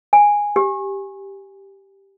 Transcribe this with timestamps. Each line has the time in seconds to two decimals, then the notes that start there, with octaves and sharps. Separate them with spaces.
0.13 G#5
0.56 G4